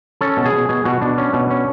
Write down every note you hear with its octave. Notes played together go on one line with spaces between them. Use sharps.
C#4 A4
B2
G#4
B2
B2 G#4
B2 F#4
B2 D4
C#4
B2
C#4